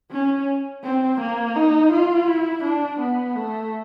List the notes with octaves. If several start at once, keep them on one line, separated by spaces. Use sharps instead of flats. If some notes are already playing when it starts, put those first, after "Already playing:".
C#4
C4
A#3
D#4
F4
E4
D4
B3
A3